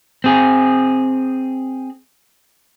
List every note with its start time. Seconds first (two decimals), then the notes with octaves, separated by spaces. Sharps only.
0.24 C4 G#4